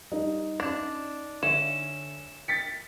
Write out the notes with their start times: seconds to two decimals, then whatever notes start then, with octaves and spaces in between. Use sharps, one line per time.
0.12 G3 D#4 G4 A#4
0.60 C#4 D4 E7
1.43 D3 C#4 A4 E5 E7
2.48 G5 A6 B6 C#7